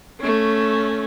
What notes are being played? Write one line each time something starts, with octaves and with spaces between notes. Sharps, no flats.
A3 C#4